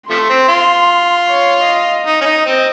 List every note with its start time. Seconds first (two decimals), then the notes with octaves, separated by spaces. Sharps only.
0.10 C3 F3 A3 C6
0.29 C4
0.48 F4
1.28 C#5
1.67 D#5
2.06 D#4
2.21 C#4
2.26 D#4
2.46 C4